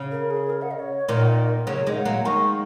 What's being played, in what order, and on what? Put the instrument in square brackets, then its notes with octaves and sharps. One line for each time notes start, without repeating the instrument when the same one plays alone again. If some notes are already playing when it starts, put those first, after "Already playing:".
Already playing: [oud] C#3
[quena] A#4
G#4
A#4
F#5
D#5
C#5
[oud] A#2 D#3 [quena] C#5
[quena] F#5
D#5
A#4
[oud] C#3 F#3 [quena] C#5
[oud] D#3 G#3 [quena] D#5
[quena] F#5
[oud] F#3 A#3
[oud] D#3 G#3 [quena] C#6